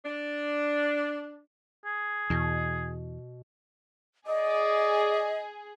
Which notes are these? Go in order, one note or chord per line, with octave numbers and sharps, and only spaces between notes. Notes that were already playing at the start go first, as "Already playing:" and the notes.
D4
G#4
E2 B2
G#4 D5 D#5 D6 D#6